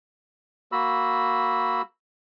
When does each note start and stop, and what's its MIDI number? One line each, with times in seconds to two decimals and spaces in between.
0.72 1.82 58
0.72 1.82 66
0.72 1.82 83
0.72 1.82 88